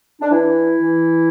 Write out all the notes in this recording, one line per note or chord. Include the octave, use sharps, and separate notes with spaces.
D4
E3 E4
E3